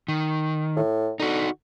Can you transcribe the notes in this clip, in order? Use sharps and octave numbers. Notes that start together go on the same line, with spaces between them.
D#3
A2
D3 D#4 F#4